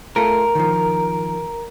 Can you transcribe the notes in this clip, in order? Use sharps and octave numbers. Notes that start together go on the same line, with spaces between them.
A3 F4 A4 A#4
D#3 F3